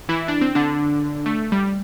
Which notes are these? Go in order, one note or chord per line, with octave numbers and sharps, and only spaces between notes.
E3 E4
D4
C4
D3 D4
A3
G3